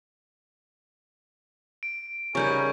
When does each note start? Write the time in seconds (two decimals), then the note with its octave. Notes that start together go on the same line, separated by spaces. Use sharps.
1.83 D7
2.35 C#3 G3 D#4 A#4 G#5 C#6 G6